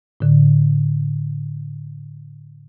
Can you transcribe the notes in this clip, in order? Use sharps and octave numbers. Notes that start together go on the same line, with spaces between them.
A2 D3